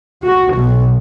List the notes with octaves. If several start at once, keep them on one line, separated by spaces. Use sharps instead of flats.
F#4
B1